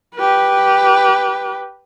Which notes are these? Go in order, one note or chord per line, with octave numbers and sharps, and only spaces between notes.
G4 B4